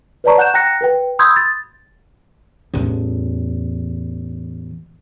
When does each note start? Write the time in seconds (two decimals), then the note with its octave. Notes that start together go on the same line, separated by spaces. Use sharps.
0.24 B4 C#5 D5 A5 A#5 C#6
0.38 F#5 F#6 G6 E7
0.54 G5 A#5 F#6 A#6 C#7
0.81 A#4 B4 G5
1.19 B5 C6 D#6 E6 G6 G#6
1.36 A6
2.74 A1 E2